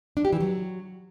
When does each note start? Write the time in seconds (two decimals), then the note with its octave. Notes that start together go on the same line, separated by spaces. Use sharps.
0.17 D4
0.25 G4
0.33 E3
0.40 F#3